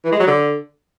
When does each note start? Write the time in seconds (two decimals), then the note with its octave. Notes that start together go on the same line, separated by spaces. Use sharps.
0.04 E3
0.12 G#3
0.19 F#3
0.27 D3